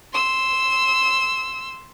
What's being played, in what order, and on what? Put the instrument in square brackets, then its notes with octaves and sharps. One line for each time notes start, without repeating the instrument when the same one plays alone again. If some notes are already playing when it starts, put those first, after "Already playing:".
[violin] C6 E6